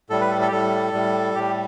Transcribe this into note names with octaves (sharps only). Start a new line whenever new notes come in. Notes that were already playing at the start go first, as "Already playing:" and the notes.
A2 G3 A4
B4
A4
A4
G4
A2 G3 A4
A2 G3
A2 G3 G4